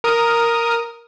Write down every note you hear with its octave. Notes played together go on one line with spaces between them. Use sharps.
A#4 D#6